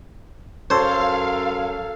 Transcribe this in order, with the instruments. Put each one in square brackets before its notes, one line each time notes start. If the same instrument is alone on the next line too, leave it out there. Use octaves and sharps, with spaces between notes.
[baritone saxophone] F#2 [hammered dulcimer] A4 C#5 [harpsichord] C5 [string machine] F5